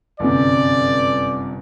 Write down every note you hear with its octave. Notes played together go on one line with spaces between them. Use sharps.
G1 F#2 C3 D5